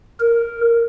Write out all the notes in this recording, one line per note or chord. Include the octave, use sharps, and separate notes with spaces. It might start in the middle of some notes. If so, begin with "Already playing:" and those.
A#4